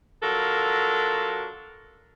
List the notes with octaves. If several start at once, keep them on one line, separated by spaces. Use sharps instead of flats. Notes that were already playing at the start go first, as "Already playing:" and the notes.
F#3 D4 F4 F#4 A4 A#4